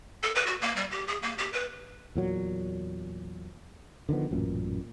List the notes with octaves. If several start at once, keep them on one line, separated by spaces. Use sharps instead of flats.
A4
B4
F#4
A#3
G3
G4
G#4
A#3
G4
B4
E2 A#2 F#3
D3 D#3 F3 B3
A1 F#2 A#2